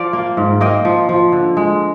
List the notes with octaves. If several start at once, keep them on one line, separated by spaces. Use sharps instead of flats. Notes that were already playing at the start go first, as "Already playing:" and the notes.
Already playing: F3 D5 F5
A#3
G#2
A#3 D#5 G5
F3
F3
D3
G#3